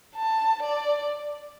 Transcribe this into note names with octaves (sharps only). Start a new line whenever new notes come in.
A5
D5